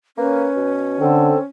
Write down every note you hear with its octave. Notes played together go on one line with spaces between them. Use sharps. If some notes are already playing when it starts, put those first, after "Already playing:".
A#3 C#4 B4
B2
D3 C4 A4